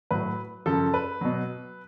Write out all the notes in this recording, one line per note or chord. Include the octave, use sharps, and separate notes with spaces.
A2 F#3 B4
F#2 C#3 F3 A4
B4
B2 F#3